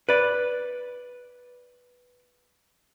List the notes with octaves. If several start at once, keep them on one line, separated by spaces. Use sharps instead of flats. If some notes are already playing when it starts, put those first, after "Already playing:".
B4 D5